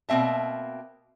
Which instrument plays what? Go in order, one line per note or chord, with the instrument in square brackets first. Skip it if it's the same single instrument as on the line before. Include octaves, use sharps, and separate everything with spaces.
[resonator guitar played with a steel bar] B2 A#3 C4 E5 A5